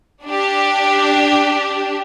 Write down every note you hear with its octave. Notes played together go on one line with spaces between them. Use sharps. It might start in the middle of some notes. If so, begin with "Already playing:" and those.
D4 G4